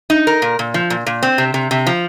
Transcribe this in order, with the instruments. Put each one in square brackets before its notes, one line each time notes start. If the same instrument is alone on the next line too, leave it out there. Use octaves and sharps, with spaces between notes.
[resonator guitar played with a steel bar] D#4
A#4
A#2
A#2
F3
A#2
A#2
C4
C3
C3
C3
F3